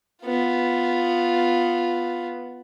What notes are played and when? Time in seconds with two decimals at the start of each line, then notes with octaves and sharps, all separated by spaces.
0.23 B3 F4